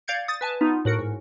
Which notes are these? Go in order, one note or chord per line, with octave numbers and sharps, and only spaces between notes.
D5 F5 G6 G#6 C#7
D#6 A6
B4 G#5 A5
B3 D#4 F4
A2 F#4 A#4 C#7
G#2